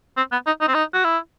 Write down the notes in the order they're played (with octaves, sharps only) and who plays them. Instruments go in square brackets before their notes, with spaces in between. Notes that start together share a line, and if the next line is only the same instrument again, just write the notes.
[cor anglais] C4
B3
D#4
D#4
C4
D#4
F#4
E4